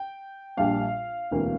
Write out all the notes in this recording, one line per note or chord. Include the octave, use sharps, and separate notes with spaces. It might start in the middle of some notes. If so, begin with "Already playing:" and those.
Already playing: G5
A#1 A#2 G3 D4 F5
E1 D2 C3 E3 A#3